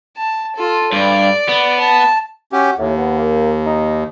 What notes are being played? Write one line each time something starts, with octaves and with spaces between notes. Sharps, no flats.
A5
F4 A4
G2 D5
B3
A5
C#4 F#4 G4
D#2 A2
B3
A#3
D#4